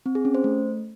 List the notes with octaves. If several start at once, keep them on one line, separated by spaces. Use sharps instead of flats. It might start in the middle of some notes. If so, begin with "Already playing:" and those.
C4
G#4
C#4
C5
A3